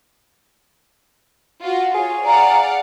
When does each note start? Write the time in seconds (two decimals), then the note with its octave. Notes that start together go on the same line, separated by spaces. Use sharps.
1.63 F4 F#4
1.95 F4 G#4 C#5
2.26 D5 F5 F#5 A#5